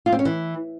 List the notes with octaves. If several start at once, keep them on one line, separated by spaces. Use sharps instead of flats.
F4
C4
C#4
E3